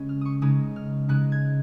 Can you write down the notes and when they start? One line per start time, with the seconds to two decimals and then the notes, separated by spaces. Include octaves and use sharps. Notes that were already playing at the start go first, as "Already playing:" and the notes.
Already playing: C#3 G#3 C#4
0.09 F6
0.21 C#6 D#6
0.42 C#3 G#3 D#4 D#6
0.76 F6
1.08 C#3 G#3 D#4 F#6
1.32 G#6